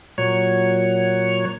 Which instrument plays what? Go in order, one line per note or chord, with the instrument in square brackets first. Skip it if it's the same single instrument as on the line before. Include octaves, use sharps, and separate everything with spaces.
[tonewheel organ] A#2 F#3 C#5